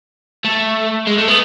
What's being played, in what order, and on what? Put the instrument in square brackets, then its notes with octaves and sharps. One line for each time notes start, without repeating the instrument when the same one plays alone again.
[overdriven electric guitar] A3
G#3
A3
B3